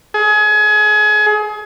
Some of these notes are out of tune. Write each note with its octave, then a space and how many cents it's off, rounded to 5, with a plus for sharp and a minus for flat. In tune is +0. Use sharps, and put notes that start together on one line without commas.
G#4 +30